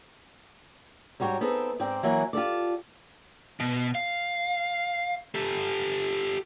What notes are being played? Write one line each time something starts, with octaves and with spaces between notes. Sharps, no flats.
G#2 G3 F#4 C#5 G5
B3 C4 D#4 G#4 A4
G#2 C4 D5 G5
E3 F#3 A#3 F#5 G#5
F4 G4 A4 D5
B2
F5
G4 A4